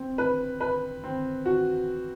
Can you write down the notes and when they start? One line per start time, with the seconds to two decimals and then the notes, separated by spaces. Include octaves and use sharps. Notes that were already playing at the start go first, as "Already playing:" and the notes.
Already playing: C4
0.18 B4
0.61 B4
1.04 C4
1.46 F#4